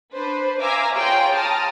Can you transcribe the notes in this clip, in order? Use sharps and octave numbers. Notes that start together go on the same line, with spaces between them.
D4 B4 C5
E5 F5 G#5 A#5 D6 E6
F4 G#4 C#5 G5 A#5 C6
A5 A#5 D#6 F6